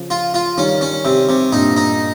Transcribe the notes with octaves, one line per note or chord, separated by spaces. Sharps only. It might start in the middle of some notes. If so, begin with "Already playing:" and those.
Already playing: C#3 F3
F4
F4
D#3 G3 C#4
C#4
C3
C3
G2 A#2 D#4
D#4